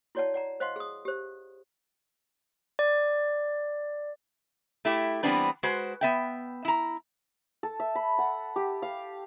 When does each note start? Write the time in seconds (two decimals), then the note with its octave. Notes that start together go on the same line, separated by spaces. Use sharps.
0.15 E4 F#4 C#5 D5 F#5 A5
0.34 D5 F#5 A#5
0.60 C5 D#5 F5 F#5 C6
0.76 G#4 D#6
1.05 G4 C5
2.79 D5
4.85 A3 E4 G4
5.23 E3 G3 B3 C4 D4 B4
5.63 G#3 F#4 B4 C5
6.01 B3 E5 G5
6.65 E4 A#5
7.63 A4
7.80 E5
7.95 B5
8.18 F#5
8.56 G4
8.82 F5